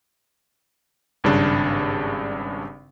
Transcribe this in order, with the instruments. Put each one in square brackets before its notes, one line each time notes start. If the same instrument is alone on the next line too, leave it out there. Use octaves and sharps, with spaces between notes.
[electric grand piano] G#1 G2 C#3 D4